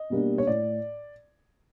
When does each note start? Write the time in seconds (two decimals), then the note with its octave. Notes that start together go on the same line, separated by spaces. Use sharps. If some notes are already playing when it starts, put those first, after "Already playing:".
Already playing: D#5
0.10 B2 G3 A#3 D4
0.38 C#5
0.47 A2 D5